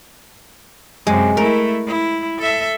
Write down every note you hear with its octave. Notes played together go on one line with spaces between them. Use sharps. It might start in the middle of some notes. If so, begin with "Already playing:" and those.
F#2 C3 G#3
A3 E4 A#4
E4
A4 E5